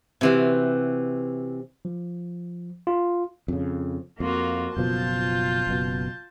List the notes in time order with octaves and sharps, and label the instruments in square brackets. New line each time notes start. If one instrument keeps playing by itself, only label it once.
[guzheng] C3 E3 F#4
[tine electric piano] F3
F4
[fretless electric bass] F2 C#3
[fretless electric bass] F2 [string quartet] A#3 F4 F#4
[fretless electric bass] F#1 B2 F3 [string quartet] F4 A5 G6
[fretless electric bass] F#1 B2